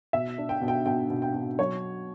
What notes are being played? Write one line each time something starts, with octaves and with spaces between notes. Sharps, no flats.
B2 E5
D4
G5
B2
G5
B2 G5
B2
G5
B2
F#3 C#5